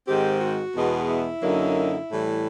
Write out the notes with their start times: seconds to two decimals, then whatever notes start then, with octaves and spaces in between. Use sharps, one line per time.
0.07 G#2 D#3 G#3 C4 G4
0.40 F#4
0.74 E2 B2 G#3 B3
1.08 E4
1.42 F#2 D3 F#3 A#3 D#4
2.09 A2 E3 G3